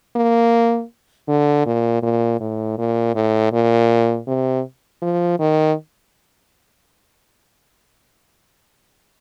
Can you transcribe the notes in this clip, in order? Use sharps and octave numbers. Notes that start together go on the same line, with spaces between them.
A#3
D3
A#2
A#2
A2
A#2
A2
A#2
C3
F3
D#3